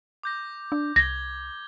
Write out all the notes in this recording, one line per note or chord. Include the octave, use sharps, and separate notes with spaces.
D6 G6 A#6
D4
C2 G#6 A#6 G7